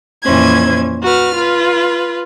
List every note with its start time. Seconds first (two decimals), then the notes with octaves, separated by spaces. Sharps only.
0.23 F2 A#2 E3 C#4 C5 G#6
1.03 F#4 B4 F6
1.36 F4 B4